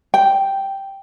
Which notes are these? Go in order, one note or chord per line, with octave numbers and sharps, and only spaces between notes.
G5